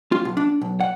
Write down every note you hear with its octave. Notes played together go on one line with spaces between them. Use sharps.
F4
B1
D4
B1
F#5